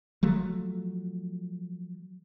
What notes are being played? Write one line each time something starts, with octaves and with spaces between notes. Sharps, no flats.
F3 F#3 A3